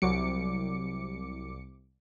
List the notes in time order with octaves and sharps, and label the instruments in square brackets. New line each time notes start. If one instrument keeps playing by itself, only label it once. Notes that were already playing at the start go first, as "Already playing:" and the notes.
[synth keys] C2 D6 C#7 [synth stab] F#3